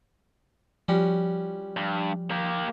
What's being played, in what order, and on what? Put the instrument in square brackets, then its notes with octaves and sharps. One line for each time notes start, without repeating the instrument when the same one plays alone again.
[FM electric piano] F3 [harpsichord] G3 C#4 F#4
[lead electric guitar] G2
A#3 G4